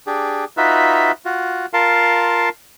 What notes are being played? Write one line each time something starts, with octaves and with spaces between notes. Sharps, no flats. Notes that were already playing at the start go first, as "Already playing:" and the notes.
D4 G4 G#4
D#4 F4 F#4 B4 E5
F4 F#4
F4 A#4 F5 A5 C6